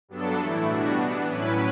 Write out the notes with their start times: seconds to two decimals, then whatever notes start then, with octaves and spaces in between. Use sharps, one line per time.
0.08 G2 F#3 B3 D4 A4
0.38 A2 E3 A3 E4
0.67 B2 G3 B3 D4 F#4
0.96 E3 B3 D4
1.25 A2 F#3 C#4 E4 B4